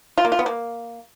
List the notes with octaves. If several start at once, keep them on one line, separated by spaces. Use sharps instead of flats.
F4
A#3
F4
B3
A#3